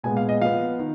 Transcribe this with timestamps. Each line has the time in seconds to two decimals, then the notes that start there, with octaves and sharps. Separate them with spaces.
0.03 A#2 G#3 B3 G#5
0.17 F5
0.29 D#5
0.41 F3 B3 F5
0.79 D#3